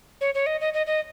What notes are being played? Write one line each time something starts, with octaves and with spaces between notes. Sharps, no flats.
C#5
C#5
D#5
D#5
D#5
D#5